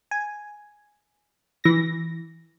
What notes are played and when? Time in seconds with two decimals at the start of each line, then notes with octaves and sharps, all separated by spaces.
0.11 G#5
1.64 E3 A#6